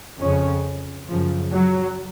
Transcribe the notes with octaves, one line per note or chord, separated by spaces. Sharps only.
F2 C#3 C#4
F#2 C#3 F3
F#3